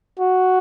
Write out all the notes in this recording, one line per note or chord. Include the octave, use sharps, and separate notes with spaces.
F#4